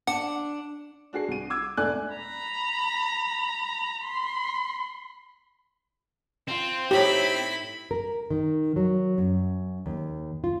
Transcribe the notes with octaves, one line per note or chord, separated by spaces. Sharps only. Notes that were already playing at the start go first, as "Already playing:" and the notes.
D4 F#5
D4 F#4 G#4 C7
C2 D#7
D6 E6 G#6
E1 A3 D4 D5 G#5 F#6
A#5 B5
B5 C6
C4 F4
A2 D#4 E4 G4 B5
A#4
D#3
F#3
F#2
D#2
F4